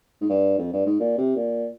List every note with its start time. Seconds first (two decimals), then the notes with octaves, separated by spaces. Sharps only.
0.21 G#2
0.29 G2
0.59 F2
0.73 G2
0.86 G#2
1.00 A#2
1.18 C3
1.36 A#2